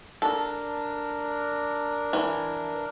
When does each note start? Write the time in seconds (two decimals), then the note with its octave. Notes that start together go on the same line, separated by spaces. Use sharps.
0.22 D4 A4 A#4
2.13 E3